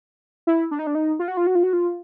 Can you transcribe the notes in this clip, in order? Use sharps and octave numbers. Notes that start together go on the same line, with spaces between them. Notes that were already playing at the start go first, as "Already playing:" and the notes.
E4
D4
D#4
D4
D#4
F4
F#4
F4
F#4
F4
F#4
F4